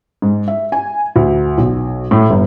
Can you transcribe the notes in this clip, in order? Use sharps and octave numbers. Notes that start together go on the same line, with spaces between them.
G#2
E5
G#5
D2
B1
A2
G1